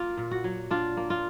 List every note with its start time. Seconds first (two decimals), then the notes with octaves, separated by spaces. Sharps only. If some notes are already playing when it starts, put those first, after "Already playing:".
Already playing: A#3 F4
0.17 A#2
0.31 F#4
0.44 F#3
0.71 D4 F4
0.97 A#3
1.10 F4